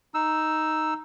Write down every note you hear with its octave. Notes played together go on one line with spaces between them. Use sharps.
D#4 E6